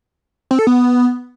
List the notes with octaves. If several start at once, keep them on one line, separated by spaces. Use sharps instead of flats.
C4
A4
B3